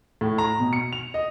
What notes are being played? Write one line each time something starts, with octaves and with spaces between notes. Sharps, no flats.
A2
A#5
B2
C#7
F7
D#5